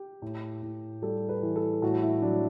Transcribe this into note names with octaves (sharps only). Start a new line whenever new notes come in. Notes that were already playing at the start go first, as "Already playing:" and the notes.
Already playing: G4
A2
A2
G3 A4
B4
E3
A4
A2 F#4
E4
F#3 D4